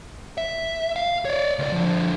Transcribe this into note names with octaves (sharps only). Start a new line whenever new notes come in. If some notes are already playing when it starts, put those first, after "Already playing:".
E5
F5
C#5 D5
C#2 D5
D3 F3